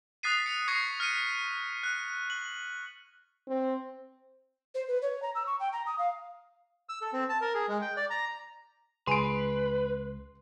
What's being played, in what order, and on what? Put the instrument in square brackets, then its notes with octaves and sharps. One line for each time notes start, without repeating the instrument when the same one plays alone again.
[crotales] D#6 F#6 A6 B6 C7 D#7
C#7
C#6 D#6 G#6 A#6 C7 C#7
F6 B6 C#7 D#7
F#6
F#7
[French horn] C4
[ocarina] C5
B4
C#5
A#5
E6
C#6
G5
A#5
D#6
F5
[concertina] E6
A4
C4
A5
A#4
G#4
G#3
G5
D5
A#5
[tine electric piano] C#2 [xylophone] G#4 G#5 F7 [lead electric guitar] B4 [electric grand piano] C6 D7